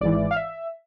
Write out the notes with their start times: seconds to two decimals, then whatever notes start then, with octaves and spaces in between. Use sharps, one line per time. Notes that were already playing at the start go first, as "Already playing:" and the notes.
0.01 G#1 G#2 E3 D5
0.31 F5
0.36 E5